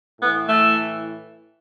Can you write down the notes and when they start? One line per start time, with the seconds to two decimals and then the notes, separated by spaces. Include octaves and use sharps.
0.21 A2 E3 B3
0.49 A3